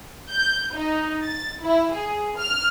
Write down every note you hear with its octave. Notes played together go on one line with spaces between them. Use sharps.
G6
D#4
A6
E4
G#4
F6